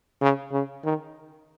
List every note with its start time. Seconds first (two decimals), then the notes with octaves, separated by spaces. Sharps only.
0.21 C#3
0.52 C#3
0.84 D#3